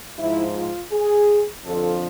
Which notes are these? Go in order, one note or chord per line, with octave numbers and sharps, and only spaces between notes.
G#2 F3 E4
F4
G#4
F2 D3 F3 A4